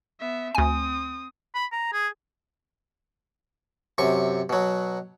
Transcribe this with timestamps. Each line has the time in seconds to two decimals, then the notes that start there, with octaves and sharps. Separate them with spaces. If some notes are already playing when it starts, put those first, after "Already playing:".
0.20 B3 E5
0.55 D2 C4 G#5 D#6
1.55 B5
1.72 A#5
1.93 G#4
3.98 F#2 C3 C#6
4.49 B2 F#3